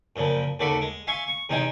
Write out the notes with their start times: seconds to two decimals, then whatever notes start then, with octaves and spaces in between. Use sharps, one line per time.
0.16 F#2 A#2 C#3 F3
0.59 D#2 C#3 F#4 A4 D5 B5
0.81 G#3
1.07 E5 F5 G#5 C6 C#6
1.28 C#6
1.49 E2 C3 G#3 D#4 G5 G#5